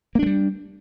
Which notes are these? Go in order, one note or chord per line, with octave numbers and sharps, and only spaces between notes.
G3 A3 A#3 D4